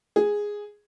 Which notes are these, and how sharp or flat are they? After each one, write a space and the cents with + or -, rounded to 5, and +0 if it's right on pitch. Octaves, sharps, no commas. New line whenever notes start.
G#4 -5